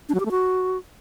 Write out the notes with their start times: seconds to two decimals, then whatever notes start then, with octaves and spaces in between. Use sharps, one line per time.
0.09 D4
0.14 F#3
0.20 G4
0.25 A3
0.31 F#4